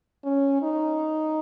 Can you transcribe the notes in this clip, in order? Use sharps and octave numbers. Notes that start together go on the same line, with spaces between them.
C#4
D#4